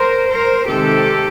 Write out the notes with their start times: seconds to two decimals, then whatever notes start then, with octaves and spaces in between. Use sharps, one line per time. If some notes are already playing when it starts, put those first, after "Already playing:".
Already playing: A#4 C5
0.30 A#4 C5
0.67 C3 D#3 G#3 C4 G4 A4